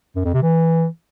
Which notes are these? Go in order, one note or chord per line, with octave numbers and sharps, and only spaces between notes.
F#2
F2
C3
E3